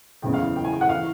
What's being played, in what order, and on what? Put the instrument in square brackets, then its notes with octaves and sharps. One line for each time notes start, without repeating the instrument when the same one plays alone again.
[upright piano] F#1 E2 C#3 E3 G5
F5
G5
G#5
G5
F#5
E3 F5